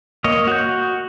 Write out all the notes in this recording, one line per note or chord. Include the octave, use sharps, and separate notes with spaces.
A#3 C#5 D#5
F#4 G6